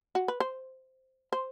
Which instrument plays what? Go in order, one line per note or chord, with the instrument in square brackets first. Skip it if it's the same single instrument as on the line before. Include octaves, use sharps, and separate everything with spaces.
[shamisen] F#4
B4
C5
C5